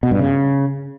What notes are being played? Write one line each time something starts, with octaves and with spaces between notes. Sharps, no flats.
B2
G2
C#3